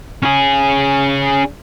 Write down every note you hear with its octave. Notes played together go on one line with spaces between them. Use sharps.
C#4 G#4